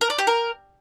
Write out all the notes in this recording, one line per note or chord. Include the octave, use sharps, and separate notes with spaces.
A#4
D5
G4
A#4